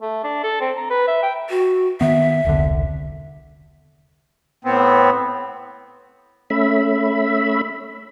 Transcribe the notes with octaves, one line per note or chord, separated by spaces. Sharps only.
A3
D4
A4
C4
A#5
B4
E5
G5
F#4
D#3 B3 E5
E1 C2 D3
A2 B3 C4
A3 C#4 E5 B5